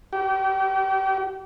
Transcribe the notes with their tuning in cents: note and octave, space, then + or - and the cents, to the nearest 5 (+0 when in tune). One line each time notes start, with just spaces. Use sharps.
G4 -35